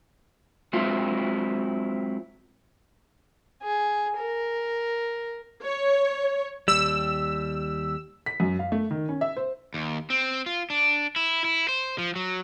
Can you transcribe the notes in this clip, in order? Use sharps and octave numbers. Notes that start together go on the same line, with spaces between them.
F#3 G#3 C4 E4 F4
G#4
A#4
C#5
D#2 G3 E6
B6
F#2
F5
A3
D#3
C#4
E5
C5
D#2
C4
F4
D4
E4
E4
C5
F3
F#3